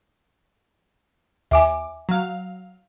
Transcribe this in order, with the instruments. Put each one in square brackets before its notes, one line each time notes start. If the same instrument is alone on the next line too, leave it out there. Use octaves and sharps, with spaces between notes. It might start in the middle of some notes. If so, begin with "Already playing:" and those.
[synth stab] D#2 D6 [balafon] E5 G#5
[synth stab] F#3 F5